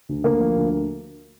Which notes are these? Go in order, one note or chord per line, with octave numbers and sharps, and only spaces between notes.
D2
D2 A#3
F3
D2